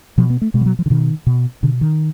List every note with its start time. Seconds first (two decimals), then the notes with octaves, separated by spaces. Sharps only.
0.18 B2 F3
0.30 B3
0.42 A3
0.54 B2 G#3
0.61 F3
0.66 F#3
0.79 F3
0.86 D3
0.90 B2 D#3
1.27 B2
1.63 B2 D3
1.81 D#3